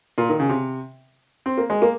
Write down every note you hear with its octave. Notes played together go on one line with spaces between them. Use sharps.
A#2
D#3
C#3
C3
C4
A#3
G#3
A#3